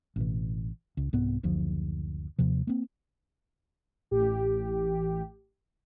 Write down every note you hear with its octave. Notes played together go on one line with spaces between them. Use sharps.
A1 B2 E3
C#2
C2 G#2 B3
F#1 D2 F3
D#2 C3 F3
A#3 C4
A1 G4